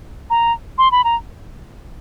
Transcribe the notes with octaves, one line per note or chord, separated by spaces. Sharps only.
A#5
C6
B5
A#5